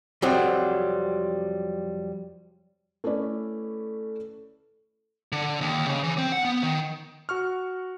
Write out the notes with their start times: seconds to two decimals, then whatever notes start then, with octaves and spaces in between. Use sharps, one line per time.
0.22 F2 C3 F#3 G3 C4
3.04 A3 C#4 E4 B4 D5
5.32 D3
5.61 D#2
5.87 C#3
6.03 E3
6.18 C4
6.32 F#5
6.45 B3
6.63 D#3
7.29 F#4 C#6 F6